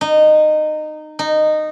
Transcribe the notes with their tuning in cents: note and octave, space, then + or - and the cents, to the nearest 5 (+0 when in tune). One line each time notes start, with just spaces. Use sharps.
D#4 -20
D#4 -15